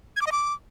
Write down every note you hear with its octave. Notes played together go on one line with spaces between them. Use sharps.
G#6
D6
D#5
D6